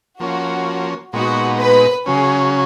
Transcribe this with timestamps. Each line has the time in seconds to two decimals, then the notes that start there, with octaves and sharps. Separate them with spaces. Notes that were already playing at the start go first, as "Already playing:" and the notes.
0.20 F3 A#3 C#4 F#4
1.13 A#2 G#3 B3 D#4 F#4
1.59 B4
2.06 C#3 F#3 C#4 G#4